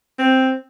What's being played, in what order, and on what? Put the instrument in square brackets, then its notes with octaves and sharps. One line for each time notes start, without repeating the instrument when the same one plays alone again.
[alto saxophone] C4